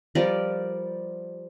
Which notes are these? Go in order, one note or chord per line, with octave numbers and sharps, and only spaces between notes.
F3 G3 A#4 D5